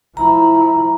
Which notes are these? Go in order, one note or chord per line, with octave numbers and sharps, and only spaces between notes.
F3 E4 A#5